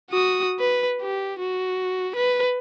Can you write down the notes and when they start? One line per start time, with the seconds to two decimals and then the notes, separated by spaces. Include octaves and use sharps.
0.11 F#4 D#6
0.60 B4
1.02 G4
1.39 F#4
2.16 B4